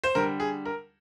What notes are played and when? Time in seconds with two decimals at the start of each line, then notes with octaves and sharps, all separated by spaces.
0.04 C5
0.15 D3 G3 A#4
0.40 G#4
0.65 A#4